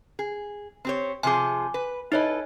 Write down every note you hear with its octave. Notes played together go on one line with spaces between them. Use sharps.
G#4
C4 G4 C#5
C3 F3 G#4 G#5 D6
B4
D#4 E4 A4 B4 C#5 D#5